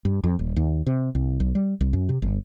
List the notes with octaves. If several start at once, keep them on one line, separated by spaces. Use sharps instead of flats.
G2
F2
D#1
D#2
C3
C2
B1
G3
C2
F#2
C3
G1